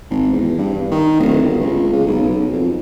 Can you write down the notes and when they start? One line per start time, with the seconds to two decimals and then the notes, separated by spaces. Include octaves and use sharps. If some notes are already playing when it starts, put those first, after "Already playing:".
0.10 G#1
0.33 E2
0.58 G2
0.91 D#3
1.20 D1
1.42 G1
1.60 C#2
1.92 C#3
2.07 B1
2.22 B1
2.53 F2